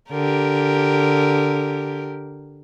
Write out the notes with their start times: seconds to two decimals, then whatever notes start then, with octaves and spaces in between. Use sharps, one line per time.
0.11 D3 G4 A#4